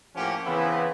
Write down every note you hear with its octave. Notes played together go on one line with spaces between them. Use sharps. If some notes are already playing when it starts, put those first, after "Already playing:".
A2 F3 A#3 C#4 G4 F#5
C#3 E3 B3 C4 E4